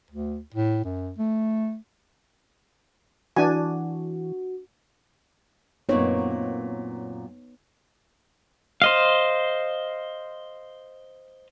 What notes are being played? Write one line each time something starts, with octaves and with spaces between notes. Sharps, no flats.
D2
A2
F#2
A3
E3 D4 F#4 G#5
F#2 A#2 B3 C4 D#4 C#5
C5 D#5 F5